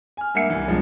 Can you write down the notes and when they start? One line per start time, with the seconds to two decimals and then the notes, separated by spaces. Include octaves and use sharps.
0.17 G#5 F6
0.34 G2 A#3 E5 F#5 C#7
0.50 C2 E3
0.68 B1 G2 F3 G#3